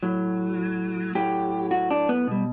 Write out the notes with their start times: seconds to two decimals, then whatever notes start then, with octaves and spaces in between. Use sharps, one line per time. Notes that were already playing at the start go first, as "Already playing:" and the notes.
0.03 A2 F#3
1.15 A2 F#3 G4
1.71 F#4
1.91 D4
2.09 B3
2.28 B2 G3